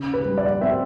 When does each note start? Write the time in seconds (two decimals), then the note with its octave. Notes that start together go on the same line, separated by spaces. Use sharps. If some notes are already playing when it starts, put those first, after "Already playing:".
Already playing: C#3
0.14 B4
0.25 G3
0.38 D5
0.61 C4 E5